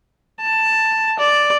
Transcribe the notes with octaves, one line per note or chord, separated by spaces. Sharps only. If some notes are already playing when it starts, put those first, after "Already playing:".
A5
D5